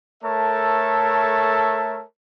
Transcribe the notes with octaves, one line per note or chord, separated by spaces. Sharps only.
A3 A4 A#4 C#5 E5 A5